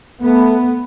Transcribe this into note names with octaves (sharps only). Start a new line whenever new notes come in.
A3 B3